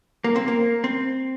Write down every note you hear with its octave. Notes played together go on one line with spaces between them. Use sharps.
A#3
C4
A#3
C4